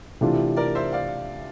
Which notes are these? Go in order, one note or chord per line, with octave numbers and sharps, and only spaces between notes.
C3 E3 A3 D4 F4
A#4 D5
C5 E5
D5 F5